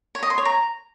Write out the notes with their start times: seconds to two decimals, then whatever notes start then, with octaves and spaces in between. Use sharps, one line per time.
0.15 C#5
0.23 D#5
0.30 C6
0.38 C#5
0.45 A#5